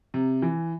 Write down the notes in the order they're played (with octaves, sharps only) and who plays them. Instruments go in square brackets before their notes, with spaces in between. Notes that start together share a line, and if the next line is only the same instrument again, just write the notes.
[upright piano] C3
E3